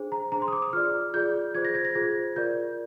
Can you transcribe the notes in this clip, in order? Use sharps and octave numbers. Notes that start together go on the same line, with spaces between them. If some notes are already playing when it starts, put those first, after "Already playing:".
Already playing: D4 G#4 C5
A#5
D4 G#4 C5 A#5
C6
D#6
D6
D#6
F4 G#4 D5 F6
F4 G#4 D5 G6
F4 G#4 C5 G#6
A#6
G#6
A#6
F4 G#4 C5 G#6
F4 A#4 D5 G6